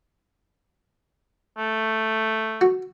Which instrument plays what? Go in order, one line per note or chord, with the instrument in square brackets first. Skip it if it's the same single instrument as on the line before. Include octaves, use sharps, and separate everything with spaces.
[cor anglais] A3
[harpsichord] F#4